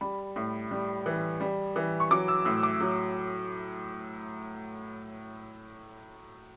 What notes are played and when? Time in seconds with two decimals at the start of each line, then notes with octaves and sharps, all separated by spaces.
0.01 G3 B5
0.36 A2
0.71 G3
1.06 E3
1.41 G3
1.76 E3
2.00 C#6
2.11 F#3 D6
2.28 E6
2.45 A2 E6
2.63 D6
2.81 F#3